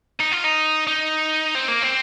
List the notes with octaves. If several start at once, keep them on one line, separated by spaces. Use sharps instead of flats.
D#4
F4
D#4
D#4
C4
A#3
C4